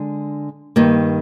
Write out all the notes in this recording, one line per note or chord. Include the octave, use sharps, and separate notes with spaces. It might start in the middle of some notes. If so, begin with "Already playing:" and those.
Already playing: D3 G#3 D4
G2 D#3 A#3